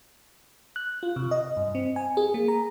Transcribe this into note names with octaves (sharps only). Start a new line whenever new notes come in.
F#6
F4
C3
D#5
G2
C4
G#5
G#4
A#3
A#5